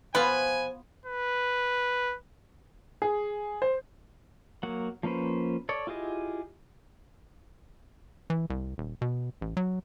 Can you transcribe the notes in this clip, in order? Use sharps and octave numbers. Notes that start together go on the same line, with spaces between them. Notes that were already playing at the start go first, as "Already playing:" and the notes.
B2 F3 B3 C4 F4 B4 F5 G#5
B4
G#4
C5
F#3 A#3 F#5
F3 A#3 C#4 B4 C5
A4 C#5 D5
E4 F4 G4 G#4 D#5
E3
C2
D#1
B2
A1
F#3